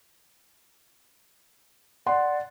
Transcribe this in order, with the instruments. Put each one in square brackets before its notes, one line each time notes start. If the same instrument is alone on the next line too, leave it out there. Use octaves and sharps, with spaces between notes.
[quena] D5 [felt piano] F#5 C6